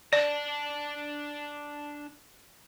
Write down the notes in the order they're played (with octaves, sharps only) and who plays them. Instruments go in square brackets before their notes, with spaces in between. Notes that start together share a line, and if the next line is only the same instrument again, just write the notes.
[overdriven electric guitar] D4 A5 [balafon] D5